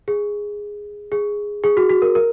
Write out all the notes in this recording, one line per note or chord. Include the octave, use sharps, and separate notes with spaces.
G#4
G#4
G#4
F#4
F#4
A#4
A#4